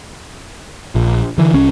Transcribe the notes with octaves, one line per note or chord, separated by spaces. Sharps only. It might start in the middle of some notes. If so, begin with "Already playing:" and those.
A#1
D3 E3
C2 C#4